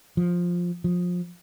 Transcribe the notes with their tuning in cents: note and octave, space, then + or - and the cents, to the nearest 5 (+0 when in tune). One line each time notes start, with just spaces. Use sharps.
F3 +10
F3 +25